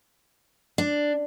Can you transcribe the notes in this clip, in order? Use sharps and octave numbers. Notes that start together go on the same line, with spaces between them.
D4